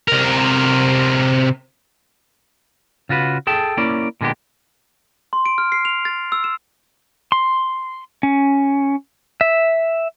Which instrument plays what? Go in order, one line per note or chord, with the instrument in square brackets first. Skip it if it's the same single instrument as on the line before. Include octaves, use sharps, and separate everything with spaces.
[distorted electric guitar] C3 A#4
[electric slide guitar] C#3 F4 F#4 B4
G#4 A4 G5 A5
A#3 C#4 E4 D5
A#2 D3 G#3 B3 G4
[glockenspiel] C6
D7
F6
C7
F7
A6
E6
E7
[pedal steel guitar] C6
C#4
E5